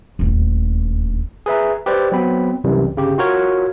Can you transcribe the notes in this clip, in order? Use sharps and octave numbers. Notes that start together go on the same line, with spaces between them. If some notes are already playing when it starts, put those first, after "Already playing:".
D#1 D2
G#4 B4 E5 A#5
G4 B4 C5 D5
F#3 B3 C4 B5
C2 F#2 C3 E3 G3
G1 C#3 G4
F4 F#4 A#4 C#5